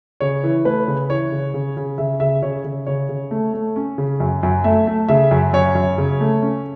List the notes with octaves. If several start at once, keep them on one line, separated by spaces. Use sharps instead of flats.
C#3 C#5
E3
A3 B4
C#3
E3 C#5
C#3
C#3
C#3
C#3 E5
C#3 E5
C#3 C#5
C#3
C#3 C#5
C#3
A3
A3
C#4
C#3
F#2
F#2
A3 E5
A3
C#3 E5
F#2
F#2 C#5
F#2
C#3
A3
C#4